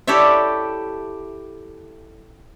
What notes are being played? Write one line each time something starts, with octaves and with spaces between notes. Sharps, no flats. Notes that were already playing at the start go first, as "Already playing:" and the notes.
E4 G4 A4 C#5 D5 E5